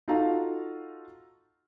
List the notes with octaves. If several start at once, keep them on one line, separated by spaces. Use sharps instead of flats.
D#4 F4 F#4 A4 F5 A#5